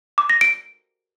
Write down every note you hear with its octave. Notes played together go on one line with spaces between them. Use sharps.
D6
A#6
D7